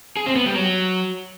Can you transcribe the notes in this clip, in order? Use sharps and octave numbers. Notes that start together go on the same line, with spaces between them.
G#4
C4
B3
G3
F#3